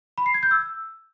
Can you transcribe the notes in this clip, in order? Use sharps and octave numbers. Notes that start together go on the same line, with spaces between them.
B5
C7
G#6
G6
E6